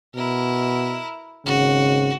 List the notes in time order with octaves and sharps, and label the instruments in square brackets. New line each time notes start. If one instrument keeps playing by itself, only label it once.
[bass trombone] B2 [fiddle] E4 A#4
[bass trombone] G#1 [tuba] C#3 [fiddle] F#4